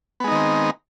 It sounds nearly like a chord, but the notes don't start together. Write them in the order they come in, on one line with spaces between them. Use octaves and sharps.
B3 G#3 D#4 D#3 C4